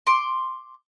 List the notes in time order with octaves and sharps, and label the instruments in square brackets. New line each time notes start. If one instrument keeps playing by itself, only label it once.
[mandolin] C6 D6